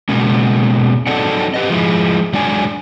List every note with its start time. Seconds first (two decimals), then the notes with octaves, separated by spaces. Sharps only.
0.09 B2 G#3 A#3 C#4
1.07 F#3 C4 D#4 A4 D5 F#5
1.54 G4 B4 D#5
1.70 F3 G#3 E4
2.33 F#3 G#3 D4 D5 G#5